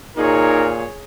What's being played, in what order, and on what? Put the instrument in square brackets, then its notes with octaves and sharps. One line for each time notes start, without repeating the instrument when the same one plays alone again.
[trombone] A#2 [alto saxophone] D#4 [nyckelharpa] G#4 C#5 [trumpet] A#4